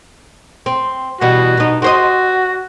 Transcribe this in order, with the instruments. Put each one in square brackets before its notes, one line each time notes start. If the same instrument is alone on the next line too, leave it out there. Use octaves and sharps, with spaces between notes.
[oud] C4
[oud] B2 E3 G3 [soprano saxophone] F#4
[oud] B2 D#4
[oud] C4 C5 D#5 [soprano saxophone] F#4